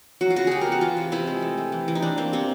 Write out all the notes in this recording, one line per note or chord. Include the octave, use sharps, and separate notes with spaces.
F#3 F#4
F4
C#3 F#4
C#3 G4 G#4
A#4
B3
F#4
E3 F4
C3
C3 E4
G#3
A3
A3
E3
E3
D#4
E3 D4
A#3 C4
C3 C4